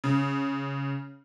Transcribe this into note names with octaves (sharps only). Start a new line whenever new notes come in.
C#3